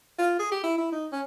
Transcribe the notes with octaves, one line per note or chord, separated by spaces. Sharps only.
F4
G#4
G4
E4
E4
D#4
C#4